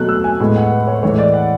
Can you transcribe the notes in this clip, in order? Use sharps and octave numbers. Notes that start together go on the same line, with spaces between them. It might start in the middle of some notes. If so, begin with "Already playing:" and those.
Already playing: B2 F#3 A3 F#6
E6
G#5
A2 G#3 B3
F#5
B4
C#5
A2 E3 G#3 C#5
D5
F#5